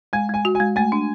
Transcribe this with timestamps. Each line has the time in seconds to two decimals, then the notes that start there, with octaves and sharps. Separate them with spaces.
0.13 G#3 G#5
0.29 G#3 G#5
0.45 F#4
0.55 G#3 G#5
0.76 A3 G#5
0.92 D4